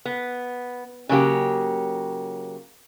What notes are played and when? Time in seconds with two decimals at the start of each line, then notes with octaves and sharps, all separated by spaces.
0.05 B3
1.09 C#3 F#3 A#3 G4